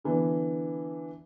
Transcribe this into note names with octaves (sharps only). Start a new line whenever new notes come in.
D3 E3 B3 D4